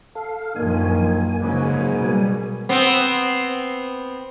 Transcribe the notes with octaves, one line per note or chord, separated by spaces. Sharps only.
A4 F5
A#1 F#2 D#3 F3 A#3 G#5
G#2 C#3 F#3
B2 G3
B3 C4